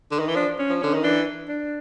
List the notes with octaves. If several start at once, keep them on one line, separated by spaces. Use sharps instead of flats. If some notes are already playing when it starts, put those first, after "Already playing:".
D3
D#3
E3
F3 D4
C#4
F3
D3 C#4
D#3
E3 D4
D4